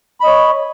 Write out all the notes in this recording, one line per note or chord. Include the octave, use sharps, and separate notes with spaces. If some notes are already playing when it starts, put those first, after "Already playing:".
C#5 D#5 B5